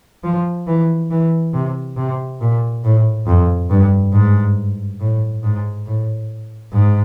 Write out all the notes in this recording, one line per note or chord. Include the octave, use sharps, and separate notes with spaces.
F3
E3
E3
C3
C3
A#2
A2
F2
G2
G#2
A2
G#2
A2
G#2